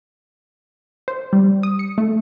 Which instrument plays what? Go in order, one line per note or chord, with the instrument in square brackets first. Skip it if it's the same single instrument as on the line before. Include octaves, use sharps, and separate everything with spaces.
[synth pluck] C5
G3
D#6
C#7
A3